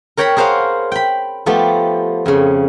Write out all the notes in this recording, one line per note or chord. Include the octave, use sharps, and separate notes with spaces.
A#4 C#5 G5 A#5 B5
G#4 A#4 C5 C#5 F5 F#5
G5 B5
F3 A3 B3 G4
F2 C#3